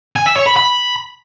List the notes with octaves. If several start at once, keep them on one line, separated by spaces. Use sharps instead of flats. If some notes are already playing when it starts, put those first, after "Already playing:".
G#5
E5
C#5
B5
B5